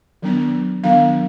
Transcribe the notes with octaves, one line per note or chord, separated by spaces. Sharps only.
D#3 F#3 B3 D4
D#3 F#3 B3 D4 F5